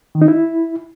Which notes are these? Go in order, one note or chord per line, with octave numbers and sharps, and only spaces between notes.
D#3
D#4
E4